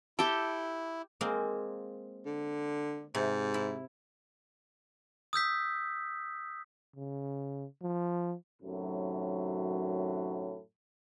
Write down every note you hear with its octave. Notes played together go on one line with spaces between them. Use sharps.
E4 G4 A4 G5
G#3 A#3 C4
D3
G#2 C3
E4
D#6 E6 G6 B6
C#3
F3
F#2 A2 C3 D#3 F#3